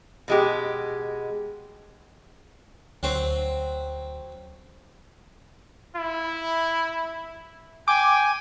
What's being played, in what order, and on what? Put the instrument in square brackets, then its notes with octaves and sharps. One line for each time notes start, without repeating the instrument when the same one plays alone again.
[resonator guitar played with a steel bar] B2 G#3 G4
[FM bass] D2 [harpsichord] F#3 C4
[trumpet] E4
[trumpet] G5 [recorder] G#5 [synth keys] D6